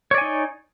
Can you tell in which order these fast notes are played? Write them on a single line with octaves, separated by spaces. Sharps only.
C#5 D5 G#5 D#4